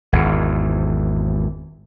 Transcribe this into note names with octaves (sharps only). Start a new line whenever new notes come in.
G#1 E2